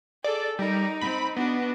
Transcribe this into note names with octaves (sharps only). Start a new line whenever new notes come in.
G#4 A4 D5
G3 D#4 A#4
C4 B5
B3 D4 F#4